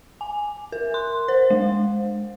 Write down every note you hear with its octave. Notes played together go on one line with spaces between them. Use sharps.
G#5
A#4
C6
C5
G#3